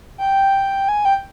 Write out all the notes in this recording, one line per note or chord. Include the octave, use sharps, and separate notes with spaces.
G5
G#5
G5